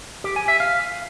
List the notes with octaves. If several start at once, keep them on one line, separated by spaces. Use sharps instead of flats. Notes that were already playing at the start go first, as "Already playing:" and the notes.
G4
G#5
E5
F5